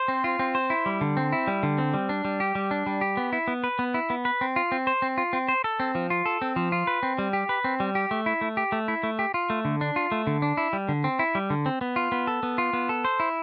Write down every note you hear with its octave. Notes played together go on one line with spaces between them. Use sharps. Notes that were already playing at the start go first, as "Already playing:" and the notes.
Already playing: C5
C4
F4
C4
C5
E4
G3
D3
C4
E4
G3
D3
C4
G3
D4
G3
G4
G3
D4
G3
G4
B3
E4
B3
B4
B3
E4
B3
B4
C4
F4
C4
C5
C4
F4
C4
C5
A4
C4
F3
F4
A4
C4
F3
F4
B4
C4
G3
G4
B4
C4
G3
G4
A3
E4
A3
G4
A3
E4
A3
G4
F4
A3
D3
D4
F4
A3
D3
D4
E4
G3
D3
C4
E4
G3
D3
C4
B3
F4
B3
A4
B3
F4
B3
A4
C5
E4